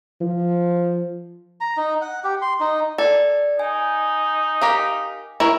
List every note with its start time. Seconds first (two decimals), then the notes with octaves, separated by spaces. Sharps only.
0.21 F3
1.61 A#5
1.77 D#4
2.02 F#5
2.24 G4
2.42 C6
2.60 D#4
2.98 A4 D5
3.59 D#4 G#5
4.61 G4 A#4 F5
5.40 E4 A#4 C#5